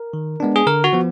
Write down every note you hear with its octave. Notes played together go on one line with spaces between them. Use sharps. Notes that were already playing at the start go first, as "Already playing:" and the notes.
Already playing: A#4
D#3
G#3 B3 D4
G#4
D3 A#4
F#4
F3 B3